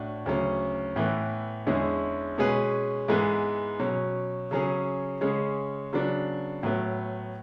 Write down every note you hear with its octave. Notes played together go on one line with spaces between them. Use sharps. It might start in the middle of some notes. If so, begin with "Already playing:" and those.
Already playing: A2 D4 F#4
D2 C#3 F#3 C#4
A2 E3 B3
E2 D3 G#3 C#4 E4
B2 G#3 C#4 G#4 B4
G#2 E3 G#3 B3
B2 F#3 C#4
C#3 F#3 C#4 G#4
C#3 G#3 C#4
C#3 F#3 B3 D4
A2 F#3 B3